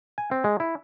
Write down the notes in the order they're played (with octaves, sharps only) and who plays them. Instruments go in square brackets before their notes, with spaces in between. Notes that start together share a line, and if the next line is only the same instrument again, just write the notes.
[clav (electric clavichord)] G#5
C4
G#3
E4